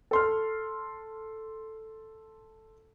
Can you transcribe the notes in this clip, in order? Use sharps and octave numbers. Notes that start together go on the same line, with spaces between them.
A4 C6 F6